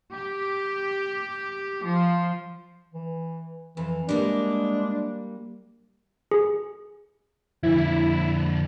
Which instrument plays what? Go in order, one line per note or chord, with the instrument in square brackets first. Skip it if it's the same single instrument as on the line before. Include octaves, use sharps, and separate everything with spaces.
[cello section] G4
F3
[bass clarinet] E3
[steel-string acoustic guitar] F2 [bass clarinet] E3
[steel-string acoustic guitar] G3 A#3 [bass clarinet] G#3 [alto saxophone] D4
[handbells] G#4
[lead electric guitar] F2 D3 [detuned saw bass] E4